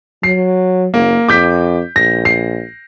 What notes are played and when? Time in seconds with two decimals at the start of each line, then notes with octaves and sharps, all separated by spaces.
0.23 F#3 C7
0.94 F#1 A#3
1.29 F2 D6 G6 B6
1.96 A#1 A#6
2.25 C7